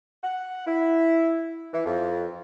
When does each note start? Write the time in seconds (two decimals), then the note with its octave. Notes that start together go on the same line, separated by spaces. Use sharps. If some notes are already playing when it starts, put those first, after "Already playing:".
0.23 F#5
0.67 E4
1.73 E3
1.86 F2